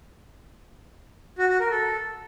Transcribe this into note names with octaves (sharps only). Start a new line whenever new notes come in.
F#4
F#4
A#4
A4